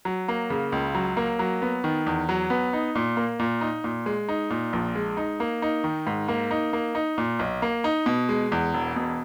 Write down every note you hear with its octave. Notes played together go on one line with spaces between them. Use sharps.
F#3
A#3
C#3
C#2
F#3
A#3
F#3
B3
D#3
E2
F#3
B3
D#4
A#2
A#3
A#2
D#4
A#2
G#3
D#4
A#2
A#1
G#3
D#4
A#3
D#4
D#3
G#2
A#3
D#4
A#3
D#4
A#2
B1
A#3
D#4
B2
G#3
E2
E1
B2